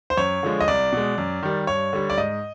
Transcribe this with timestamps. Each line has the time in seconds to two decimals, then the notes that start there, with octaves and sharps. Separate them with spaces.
0.10 C5
0.17 F#2 C#5
0.43 D3 F3 G#3
0.60 D#5
0.68 C2 D5
0.93 B2 G#3
1.18 F#2
1.43 D#3 G3
1.67 G2 C#5
1.93 D3 G3
2.10 D5
2.18 G#2 D#5